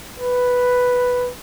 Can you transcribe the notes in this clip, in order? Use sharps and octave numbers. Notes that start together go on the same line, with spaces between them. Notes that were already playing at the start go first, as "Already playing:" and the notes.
B4